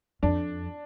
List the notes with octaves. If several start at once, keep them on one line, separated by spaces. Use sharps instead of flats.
F2 D4